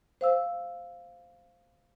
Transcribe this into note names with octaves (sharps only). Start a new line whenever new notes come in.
C5 F5 E6